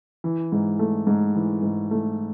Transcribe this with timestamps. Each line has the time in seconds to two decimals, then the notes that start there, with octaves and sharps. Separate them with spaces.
0.24 E3
0.52 G#2
0.79 A3
1.07 G#2
1.35 E3
1.63 G#2
1.91 A3